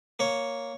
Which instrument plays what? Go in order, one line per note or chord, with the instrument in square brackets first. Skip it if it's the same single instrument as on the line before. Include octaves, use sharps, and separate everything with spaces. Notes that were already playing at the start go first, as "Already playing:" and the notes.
[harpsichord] A#3 C#5